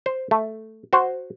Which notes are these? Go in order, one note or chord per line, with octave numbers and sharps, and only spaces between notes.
C5
A3
F#4 C5